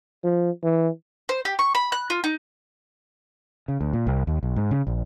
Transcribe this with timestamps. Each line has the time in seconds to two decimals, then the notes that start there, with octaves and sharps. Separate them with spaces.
0.24 F3
0.63 E3
1.29 C5
1.45 G4
1.59 C#6
1.75 B5
1.92 F#6
2.10 F4
2.24 D#4
3.68 C#3
3.81 D2
3.93 A#2
4.07 C2
4.27 D#2
4.43 B1
4.56 G#2
4.71 C#3
4.87 A#1